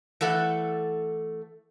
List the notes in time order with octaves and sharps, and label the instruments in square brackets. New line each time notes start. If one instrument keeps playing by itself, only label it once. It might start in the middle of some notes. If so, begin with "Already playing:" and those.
[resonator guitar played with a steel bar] E3 A3 A4 F#5